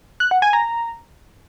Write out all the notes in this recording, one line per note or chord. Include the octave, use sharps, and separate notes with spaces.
F#6
F#5
G#5
A#5